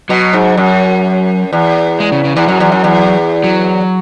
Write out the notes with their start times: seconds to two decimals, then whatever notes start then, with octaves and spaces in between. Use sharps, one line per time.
0.09 B2 F#3
0.33 G#2
0.57 F#2
1.53 E2
2.00 G#3
2.12 C#3
2.24 C#3
2.36 E2 E3
2.47 F#2 F#3
2.60 E2
2.72 F#2
2.84 E2
3.44 F#3